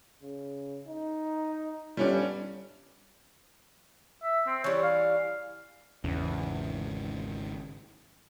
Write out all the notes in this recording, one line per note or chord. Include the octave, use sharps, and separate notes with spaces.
C#3
D#4
G1 G3 C#4 D4
E5
C4
E3 G3 C#5
F5
G#1 E2 C#3